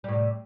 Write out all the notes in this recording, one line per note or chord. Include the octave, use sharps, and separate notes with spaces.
A2 C3 G3